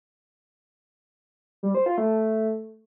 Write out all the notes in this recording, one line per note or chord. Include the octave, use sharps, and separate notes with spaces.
G3
C5
F4
A3